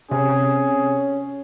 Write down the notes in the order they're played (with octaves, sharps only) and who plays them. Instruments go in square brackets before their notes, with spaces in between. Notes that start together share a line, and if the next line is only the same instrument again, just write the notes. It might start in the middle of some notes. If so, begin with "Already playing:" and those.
[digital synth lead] C3 [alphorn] C#4 [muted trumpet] G#4